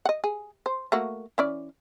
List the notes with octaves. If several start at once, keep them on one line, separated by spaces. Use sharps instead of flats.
D#5 F#5
G#4
C5
A3 A#3 F#4
E3 C#4 D5